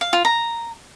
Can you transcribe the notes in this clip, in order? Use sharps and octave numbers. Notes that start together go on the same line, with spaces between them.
F5
F4
A#5